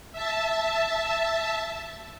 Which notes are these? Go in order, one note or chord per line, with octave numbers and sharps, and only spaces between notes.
E5 A5